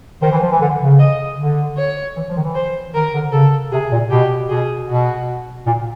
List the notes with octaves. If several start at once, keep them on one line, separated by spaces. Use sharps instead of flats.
D#3 C5
E3
F3
E3
D3
C#3
D#5
D3
C#5
E3
F3
D#3
E3
C5
D#3 A#4
D3
C#3 A4
C3 G#4
A#2
B2 G4
B2 G#4
B2 F#4
A#2